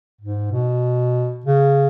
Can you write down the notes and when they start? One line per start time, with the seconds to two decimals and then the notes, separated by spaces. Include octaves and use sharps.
0.21 G#2
0.52 B2
1.46 C#3